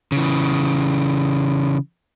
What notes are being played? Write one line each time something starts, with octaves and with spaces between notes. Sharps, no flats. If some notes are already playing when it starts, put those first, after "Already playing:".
C#3 E3